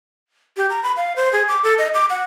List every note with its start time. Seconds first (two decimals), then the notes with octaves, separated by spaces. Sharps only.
0.57 G4
0.70 A#5
0.83 B5
0.96 F5
1.16 C5
1.33 G#4
1.48 D6
1.64 A4
1.78 D#5
1.94 D6
2.10 F#5